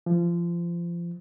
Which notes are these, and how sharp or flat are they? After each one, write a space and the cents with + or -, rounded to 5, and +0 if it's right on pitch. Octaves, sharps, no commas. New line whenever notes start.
F3 -25